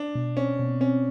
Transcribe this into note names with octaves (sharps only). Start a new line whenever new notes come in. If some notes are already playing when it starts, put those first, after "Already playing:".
Already playing: D4
B2
C4 C#4
B2
C4 C#4